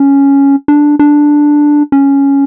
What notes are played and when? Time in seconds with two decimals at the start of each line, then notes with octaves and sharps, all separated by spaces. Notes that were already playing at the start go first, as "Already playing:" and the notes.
Already playing: C#4
0.68 D4
0.99 D4
1.92 C#4